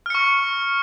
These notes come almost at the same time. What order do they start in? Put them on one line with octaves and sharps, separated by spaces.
F6 C#7 C#6